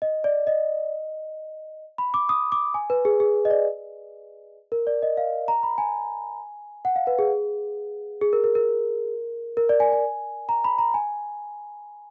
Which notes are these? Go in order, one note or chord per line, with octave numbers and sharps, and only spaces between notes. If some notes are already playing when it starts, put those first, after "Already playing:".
D#5
D5
D#5
B5
D6
D#6
D6
G#5
B4
G#4
G#4
D#5
D5
A#4
D5
D#5
F5
A#5
B5
G#5
F#5
F5
B4
G#4
G#4
A#4
A#4
A#4
A#4
D5
G#5
G#5
A#5
B5
A#5
G#5